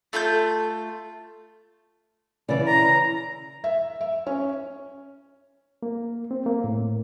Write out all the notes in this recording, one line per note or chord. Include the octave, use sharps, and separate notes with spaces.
A3 F4 A#5 G6
C#3 E3 D5
A#5
E5
E5
C#4
A#3
C4
A#3
A2